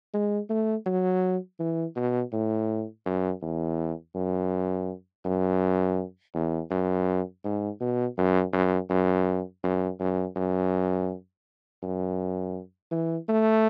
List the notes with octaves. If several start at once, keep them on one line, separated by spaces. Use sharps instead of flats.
G#3
A3
F#3
E3
B2
A2
F#2
E2
F#2
F#2
E2
F#2
G#2
B2
F#2
F#2
F#2
F#2
F#2
F#2
F#2
E3
A3